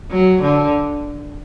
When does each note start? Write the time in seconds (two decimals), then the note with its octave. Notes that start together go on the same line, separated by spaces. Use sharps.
0.11 F#3
0.42 D3